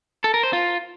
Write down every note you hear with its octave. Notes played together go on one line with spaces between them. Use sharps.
A4
A#4
C5
F4